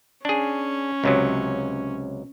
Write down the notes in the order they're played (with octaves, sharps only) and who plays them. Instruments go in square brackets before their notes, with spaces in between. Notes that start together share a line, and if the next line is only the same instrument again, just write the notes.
[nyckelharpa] C#4 [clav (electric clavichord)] D4 G#4
[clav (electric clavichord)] C#2 C3 F#3